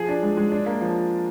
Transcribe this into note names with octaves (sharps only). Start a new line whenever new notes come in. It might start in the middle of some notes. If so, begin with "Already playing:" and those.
Already playing: F3 G#4
D4
G#3
G#3
D4
A#3
F3